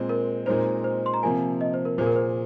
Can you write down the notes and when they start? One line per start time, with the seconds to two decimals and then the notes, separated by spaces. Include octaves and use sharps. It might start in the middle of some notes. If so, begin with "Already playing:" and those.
Already playing: A#2 G#3 C4
0.09 A#4
0.46 A#2 G#3 C4 D#4 A#4 C5
0.84 C5
1.06 C6
1.14 A#5
1.23 C3 F3 A#3 G#5
1.61 D#5
1.74 C5
1.85 A#4
1.98 A#2 A#3 G#4 C5
2.06 A#4
2.16 C5